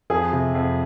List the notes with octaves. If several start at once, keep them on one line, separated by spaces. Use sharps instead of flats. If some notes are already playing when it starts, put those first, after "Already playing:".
F2 G#4
C3
F2